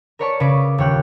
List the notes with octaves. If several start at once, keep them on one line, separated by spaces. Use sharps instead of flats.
A#4 B4 C#5 D5 A5 C#6
C#3 B4 D6
D#1 C#5 G5 F#6